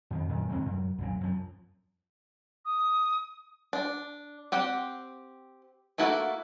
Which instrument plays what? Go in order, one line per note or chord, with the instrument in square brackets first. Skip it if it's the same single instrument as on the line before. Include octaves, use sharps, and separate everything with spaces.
[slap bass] F2 D#3
F#2 A#2 D#3
D2 C3 D#3 G#3
F#2
C2 F#2 A#2
F#2 F3
[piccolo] D#6
[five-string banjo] D4
C4 G4 F#5
A3 A#3 E4 F#4 A4